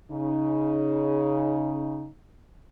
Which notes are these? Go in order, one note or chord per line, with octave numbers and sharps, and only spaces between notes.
C#3 D#4